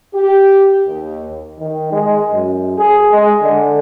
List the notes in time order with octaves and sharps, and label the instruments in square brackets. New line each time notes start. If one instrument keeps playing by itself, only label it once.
[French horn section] G4
D#2
[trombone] D#3
G#3
F#2
G#4
G#3
D3